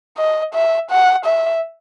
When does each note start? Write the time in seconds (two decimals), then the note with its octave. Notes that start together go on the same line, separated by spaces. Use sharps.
0.18 D#5
0.54 E5
0.91 F#5
1.26 E5